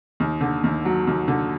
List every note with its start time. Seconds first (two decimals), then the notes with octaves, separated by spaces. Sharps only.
0.20 D#2
0.41 D3
0.64 D#2
0.85 F#3
1.07 D#2
1.28 D3